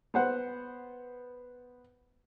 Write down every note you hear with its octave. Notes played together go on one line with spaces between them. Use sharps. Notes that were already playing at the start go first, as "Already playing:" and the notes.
B3 C5 F#5